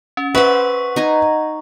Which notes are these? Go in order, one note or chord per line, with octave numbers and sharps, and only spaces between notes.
C#4
B4 C5 E5 F#5 C#6
D#4 G#5 A#5